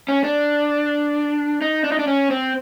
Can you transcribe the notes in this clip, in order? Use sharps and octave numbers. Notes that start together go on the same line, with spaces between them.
C#4
D4
D#4
D4
D#4
D4
C#4
C4